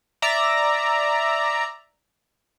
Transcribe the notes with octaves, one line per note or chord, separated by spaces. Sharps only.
D5 E5 A#5